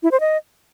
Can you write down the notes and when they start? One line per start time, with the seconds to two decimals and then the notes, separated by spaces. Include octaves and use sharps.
0.03 E4
0.12 C5
0.20 D#5